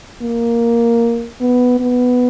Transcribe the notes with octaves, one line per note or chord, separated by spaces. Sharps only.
A#3
B3
B3